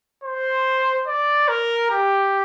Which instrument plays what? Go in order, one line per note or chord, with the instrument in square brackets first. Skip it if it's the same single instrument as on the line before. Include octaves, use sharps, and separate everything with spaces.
[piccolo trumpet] C5
D5
A#4
G4